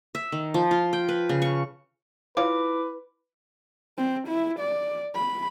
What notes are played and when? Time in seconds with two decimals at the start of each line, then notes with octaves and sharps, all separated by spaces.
0.15 E5
0.32 D#3
0.54 F3
0.71 F4
0.93 G5
1.09 B4
1.29 C#3
1.42 C#6
2.37 E4 F4 B4 C#5 D6
3.98 C4
4.28 E4
4.60 D5
5.15 B5